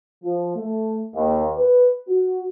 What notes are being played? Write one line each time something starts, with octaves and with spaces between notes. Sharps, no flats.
F3
A3
D#2
B4
F#4